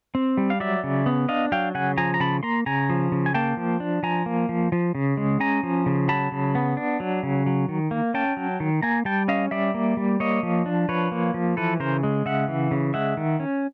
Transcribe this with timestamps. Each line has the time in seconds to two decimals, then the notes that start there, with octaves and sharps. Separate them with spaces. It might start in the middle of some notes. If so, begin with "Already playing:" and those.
0.15 C4
0.38 G3
0.50 F5
0.60 F#3 D5 E5
0.84 C#3
1.06 B3
1.29 D4 D#5 F5
1.52 F#3 F5 G5
1.75 C#3 F#5 G#5
1.98 F3 G#5 A#5
2.14 A#5
2.20 C#3 A5 B5
2.43 A#3 A#5 C6
2.66 C#3 G#5 A#5
2.90 F3
3.12 C#3
3.26 G#5
3.34 A#3 G5 A5
3.57 F3
3.80 D4
4.03 F3 G#5 A#5
4.26 A#3
4.49 F3
4.72 F3
4.95 C#3
5.17 G#3
5.40 C#4 G#5 A#5
5.63 F3
5.86 C#3
6.08 F#3 A5 B5
6.32 C#3
6.55 B3
6.77 D4
7.00 F#3
7.23 C#3
7.46 F#3
7.69 D#3
7.91 A#3
8.14 C#4 G5 A5
8.37 F#3
8.60 D#3
8.82 A#3 G#5 A#5
9.05 G3 G5 A5
9.28 C#4 D#5 F5
9.51 G3 D5 E5
9.74 A#3
9.97 G3
10.20 A#3 C#5 D#5
10.43 F3
10.66 D4
10.89 F3 B4 C#5
11.12 A#3
11.34 F3
11.57 E3 A4 B4
11.80 C#3 A#4 C5
12.03 G#3
12.26 C#3 E5 F#5
12.48 E3
12.71 C#3
12.94 G#3 E5 F#5
13.17 D#3
13.40 C#4